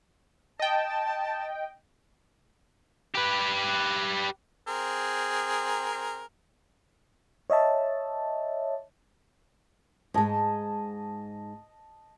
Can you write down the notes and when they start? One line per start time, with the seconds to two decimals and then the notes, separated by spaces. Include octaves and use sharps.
0.60 D#5 G5 A5
3.15 G4 B4
4.67 C4 G#4 A#4
7.50 C#5 D#5 E5 A5
10.14 G#2 G#3 D#5 A5